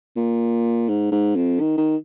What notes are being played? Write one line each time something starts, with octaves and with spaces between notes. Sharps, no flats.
A#2
G#2
G#2
F2
D#3
D#3